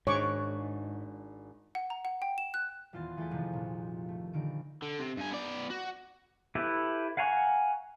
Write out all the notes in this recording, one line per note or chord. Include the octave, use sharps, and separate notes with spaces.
G#1 G#2 D4 C#5 C#6 D6 F#6
F#5
A#5
F#5
G5
E7
F#6
D#1 E2 F4 C6 A6
E3 A3 G#4 G5 A6 B6
F2 C3 D#3 F3
C2 A#2
A3
A#1 D3 D#3 D7
D3
C3
G2 G#5
B3 D5
F#4
E4 G4 A4 B4
F5 F#5 G#5 A#5 C#6